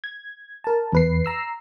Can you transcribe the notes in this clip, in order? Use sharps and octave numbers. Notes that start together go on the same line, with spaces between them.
G#6
A#4 A5
E2 B4 C7
A#5 E6 C7